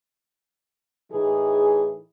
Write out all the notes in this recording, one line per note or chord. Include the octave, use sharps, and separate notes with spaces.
A2 E3 D#4 G#4